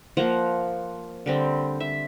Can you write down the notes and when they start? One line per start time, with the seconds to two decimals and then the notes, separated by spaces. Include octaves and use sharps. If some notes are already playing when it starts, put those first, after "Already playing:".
0.17 F3 A#3 F#5
1.26 D3 G3 C4
1.80 E5